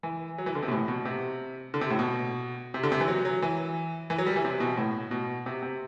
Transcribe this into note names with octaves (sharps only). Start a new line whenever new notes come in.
E3
F#3
E3
D3
C3
B2
A2
B2
C3
D3
C3
A2
B2
C3
D3
C3
E3
F#3
F#3
E3
E3
F#3
G3
E3
C3
B2
A2
B2
C3
C3